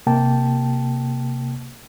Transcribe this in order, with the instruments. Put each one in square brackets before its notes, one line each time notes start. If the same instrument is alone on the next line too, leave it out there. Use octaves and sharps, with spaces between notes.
[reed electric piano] C3 A#3 G5 A5